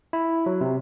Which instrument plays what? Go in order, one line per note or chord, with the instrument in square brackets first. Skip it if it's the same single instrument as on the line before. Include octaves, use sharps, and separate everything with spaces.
[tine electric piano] E4
F#3
C3